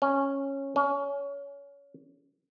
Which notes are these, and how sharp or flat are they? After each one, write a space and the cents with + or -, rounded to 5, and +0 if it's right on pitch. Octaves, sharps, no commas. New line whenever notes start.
C#4 -10
C#4 +25